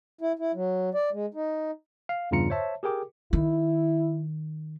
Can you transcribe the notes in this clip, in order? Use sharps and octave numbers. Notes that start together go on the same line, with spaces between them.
E4
E4
F#3
D5
G#3
D#4
F5
E2 G2 C#3 F4 A#5 C#7
C5 C#5 E5 A5
G4 G#4 A#4 G5 D6
D#3 E4